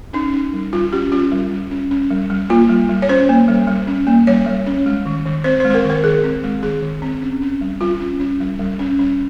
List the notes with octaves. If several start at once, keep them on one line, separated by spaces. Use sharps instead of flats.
C#4 D#4
C#4
G3
G3 F4
C#4 G4
C#4 F4
G3
G3
C#4
C#4
G3
G3
A#3 F4
G3
G3
C#5
C#4 C5
A#3
G3
G3
C#4
A#3
G3 C#5
G3
C#4
G#3
D#3
D#3
C4 C5
C5
G#3
C5
A#4
D#3
A#4
D#3 G#4
C4
G#3
D#3 G#4
D#3
C4
C#4
C#4
G3
G3 F4
C#4
C#4
G3
G3
C#4
C#4